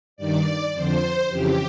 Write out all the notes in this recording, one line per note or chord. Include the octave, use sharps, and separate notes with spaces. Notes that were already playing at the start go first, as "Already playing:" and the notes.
G2 D#3 D5
F2 D3 C5
F2 C#3 E3 G4